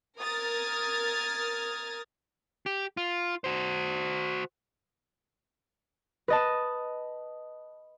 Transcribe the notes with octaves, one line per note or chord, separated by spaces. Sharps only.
A#4 D#6 F6 G#6 A6
G4
F4
F#4 C5
B4 D#5 A5